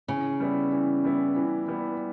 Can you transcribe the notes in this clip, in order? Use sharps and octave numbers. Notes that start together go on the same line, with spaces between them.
C#3 E3
G3 B3 E4
E3
G3 B3 E4
E3
G3 B3 E4